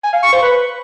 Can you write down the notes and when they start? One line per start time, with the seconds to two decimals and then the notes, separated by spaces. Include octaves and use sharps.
0.04 G#5
0.13 F5
0.23 C#6
0.33 C5
0.42 B4